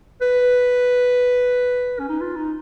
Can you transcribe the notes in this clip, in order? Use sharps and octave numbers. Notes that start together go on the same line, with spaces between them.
B4
C#4
D#4
F4
D#4